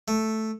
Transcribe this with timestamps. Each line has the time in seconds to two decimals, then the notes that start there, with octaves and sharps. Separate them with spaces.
0.08 A3